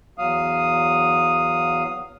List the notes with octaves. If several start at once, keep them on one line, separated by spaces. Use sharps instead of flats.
E2 F#3 F5 D#6